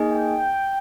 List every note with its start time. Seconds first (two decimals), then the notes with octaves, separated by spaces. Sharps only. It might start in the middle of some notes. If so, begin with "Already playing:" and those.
Already playing: A#3 D#4 G#4 D#5 G#5
0.11 G5